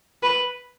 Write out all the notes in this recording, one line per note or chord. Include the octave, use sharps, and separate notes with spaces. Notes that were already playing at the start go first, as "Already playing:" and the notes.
B4